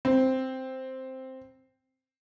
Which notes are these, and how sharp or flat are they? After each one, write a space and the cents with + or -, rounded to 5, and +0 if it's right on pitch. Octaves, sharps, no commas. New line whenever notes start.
C4 +0